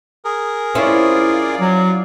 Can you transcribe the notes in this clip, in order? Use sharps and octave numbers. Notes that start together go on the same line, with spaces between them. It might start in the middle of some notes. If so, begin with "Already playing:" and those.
G#4 A#4
C4 C#4 E4 F4 D5
F#3